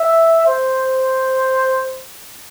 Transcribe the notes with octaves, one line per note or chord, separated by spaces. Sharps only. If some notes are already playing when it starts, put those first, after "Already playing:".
Already playing: E5
C5